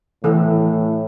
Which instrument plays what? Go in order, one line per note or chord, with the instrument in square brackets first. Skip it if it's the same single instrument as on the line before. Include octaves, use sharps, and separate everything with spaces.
[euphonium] A2 [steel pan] E3 A4